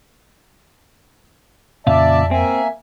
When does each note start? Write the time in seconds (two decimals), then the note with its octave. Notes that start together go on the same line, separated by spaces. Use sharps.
1.87 F2 A#2 C#3 D5 E5 F5 A5
2.31 A#3 C4 E5 G#5